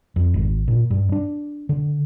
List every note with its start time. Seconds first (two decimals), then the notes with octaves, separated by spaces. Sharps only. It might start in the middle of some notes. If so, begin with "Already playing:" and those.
0.16 F2
0.34 G#1
0.68 A#2
0.90 G2
1.12 D4
1.69 D3